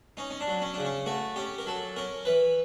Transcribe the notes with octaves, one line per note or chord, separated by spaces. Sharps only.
C#4 D#4
C#4
D4
F#3
C#4
C#3 D4
C#4
A3 F#4
C#4 G4
A#4
F#3 A4
C#4 A#4
E3 B4